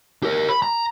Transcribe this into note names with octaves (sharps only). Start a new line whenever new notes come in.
G4 A#4
B5
A#5